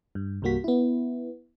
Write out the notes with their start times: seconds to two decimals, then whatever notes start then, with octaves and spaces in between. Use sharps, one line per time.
0.15 G2
0.42 C2 G2 G3 A#3 F#4 B6
0.64 B3 E4